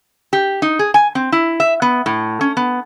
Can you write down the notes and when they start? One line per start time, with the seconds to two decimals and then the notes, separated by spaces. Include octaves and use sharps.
0.33 G4
0.62 D#4
0.79 G#4
0.94 G#5
1.15 C4
1.32 E4
1.60 E5
1.82 B3
2.06 A2
2.41 C#4
2.57 B3